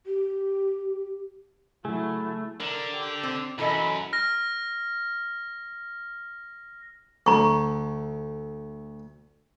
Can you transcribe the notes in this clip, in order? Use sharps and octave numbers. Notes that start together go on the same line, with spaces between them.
G4
C#3 F#3 A3 E4 G#4 G#5
D3 A#4
G4
C4
F#2 E3 A4 D#5 B5
F6 A#6
D2 A#5 C#6